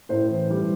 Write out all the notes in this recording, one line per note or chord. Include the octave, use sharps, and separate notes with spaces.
A2 C5
E3
G3